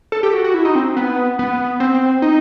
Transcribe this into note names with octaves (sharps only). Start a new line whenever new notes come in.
A4
G4
F#4
F#4
E4
D#4
C4
B3
B3
C4
D#4